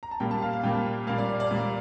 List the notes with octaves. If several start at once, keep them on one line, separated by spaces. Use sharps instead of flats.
A#5
A5
A#2 G3 A#3 G5
A5
F5
F5
A#2 G3 A#3 G5
A5
A#2 G3 A#3 F5
D5
D5
D5
A#2 G3 A#3